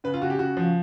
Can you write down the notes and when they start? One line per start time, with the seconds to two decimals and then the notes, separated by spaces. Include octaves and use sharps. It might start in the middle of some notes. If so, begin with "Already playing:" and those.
0.04 C#3 B4
0.14 F4
0.22 C#3 F#4
0.30 G4
0.39 C#3 F#4
0.57 F3